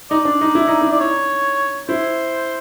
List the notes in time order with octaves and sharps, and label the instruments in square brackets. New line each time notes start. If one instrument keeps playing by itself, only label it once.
[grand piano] D#4 [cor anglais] D5
[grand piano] D4
D#4
E4
D#4
E4
[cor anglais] D5
C#5
[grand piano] E4 [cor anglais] C5